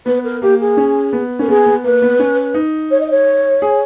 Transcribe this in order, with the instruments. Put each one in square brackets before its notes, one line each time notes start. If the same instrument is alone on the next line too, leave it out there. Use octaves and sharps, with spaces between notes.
[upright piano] B3 [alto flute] B4
[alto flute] A#4
[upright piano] A#3 [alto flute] G4
[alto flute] G#4
[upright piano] C#4
B3
[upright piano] C#4 [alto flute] A#4
[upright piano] B3 [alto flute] G#4
[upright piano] B3
[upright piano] A#3 [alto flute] B4
[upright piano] B3
C#4
D#4
[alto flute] C#5
D#5
C#5
[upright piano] G#4